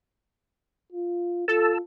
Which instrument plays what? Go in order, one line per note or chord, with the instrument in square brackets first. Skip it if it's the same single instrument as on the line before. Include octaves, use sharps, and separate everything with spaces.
[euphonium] F4
[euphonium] F4 [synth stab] A4 [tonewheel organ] A5 E6